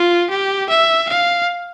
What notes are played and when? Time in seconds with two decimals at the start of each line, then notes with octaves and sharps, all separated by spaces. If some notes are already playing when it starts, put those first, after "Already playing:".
Already playing: F4
0.30 G4
0.69 E5
1.09 F5